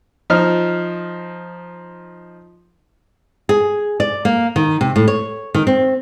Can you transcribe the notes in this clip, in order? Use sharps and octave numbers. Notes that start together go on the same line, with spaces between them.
F3 D#4 F6
G#4
D5
A#3
D#3
C3
A2
C#5
D#3
C4